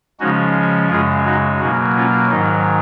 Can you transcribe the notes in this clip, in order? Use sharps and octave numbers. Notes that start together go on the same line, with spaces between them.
C#3 F3 G#3 C#4 D#4 F#4
F#2 C#3 G#3 F4 G#4
D#4 F#4
B2 F#3 A#3 D#4 F#4
C#4 F4
G#2 D#3 F#3 D#4